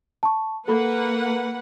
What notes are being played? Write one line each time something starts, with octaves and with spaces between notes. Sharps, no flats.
A5 C#6
A#3 A4 B4 F#5 B5